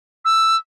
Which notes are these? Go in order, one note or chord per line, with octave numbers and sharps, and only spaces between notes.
E6